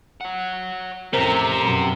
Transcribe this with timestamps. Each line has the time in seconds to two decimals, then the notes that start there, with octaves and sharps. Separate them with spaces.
0.21 C#5 F#5
1.13 A1 F2 C3 A#4 C5 A#5
1.59 F#2 B2